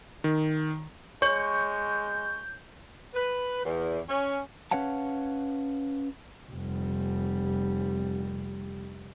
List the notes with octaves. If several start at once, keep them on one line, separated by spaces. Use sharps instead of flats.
D#3
G#3 C#5 C#6 G6
B4
E2
C#4
C#4 B4 C#5 F5 F#5 A5
F1 G3